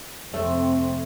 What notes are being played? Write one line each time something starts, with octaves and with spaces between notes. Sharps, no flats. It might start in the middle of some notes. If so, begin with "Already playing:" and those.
F2 C3 A3 C4